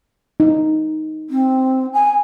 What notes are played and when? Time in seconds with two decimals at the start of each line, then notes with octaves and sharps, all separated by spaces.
0.40 D#4
1.30 C4
1.93 G#5